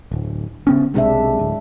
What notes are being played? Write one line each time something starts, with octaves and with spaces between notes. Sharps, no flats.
D1
C#3 B3 C#4
B1 C3 G#3 D4 E5
D1